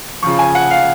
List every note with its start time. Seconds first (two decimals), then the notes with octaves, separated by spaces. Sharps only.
0.22 C#3 F3 C#6
0.39 G#5
0.55 F#5
0.70 F5